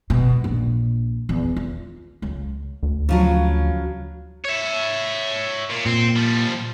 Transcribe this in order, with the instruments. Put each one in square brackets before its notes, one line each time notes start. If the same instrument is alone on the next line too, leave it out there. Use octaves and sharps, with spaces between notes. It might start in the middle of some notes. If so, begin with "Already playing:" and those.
[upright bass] B2
A#1
E2
F4
C#2
[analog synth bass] D2
[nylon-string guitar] C#3 F3 F#3
[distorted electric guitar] C#5 E5
A#2
[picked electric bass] A#2 [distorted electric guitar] C4
[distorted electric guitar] F3 G3